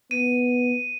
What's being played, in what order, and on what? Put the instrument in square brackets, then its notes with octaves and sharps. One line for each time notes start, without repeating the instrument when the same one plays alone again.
[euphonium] B3 [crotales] D#7